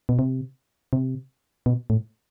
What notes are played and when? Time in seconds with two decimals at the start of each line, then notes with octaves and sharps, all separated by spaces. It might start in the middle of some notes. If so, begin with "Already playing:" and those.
0.09 B2
0.19 C3
0.93 C3
1.66 B2
1.90 A2